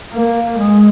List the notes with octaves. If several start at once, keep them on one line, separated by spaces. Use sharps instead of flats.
A#3
G#3